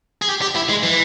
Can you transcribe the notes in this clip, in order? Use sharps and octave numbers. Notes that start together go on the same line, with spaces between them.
G#4
G4
G4
E4
G#3
E3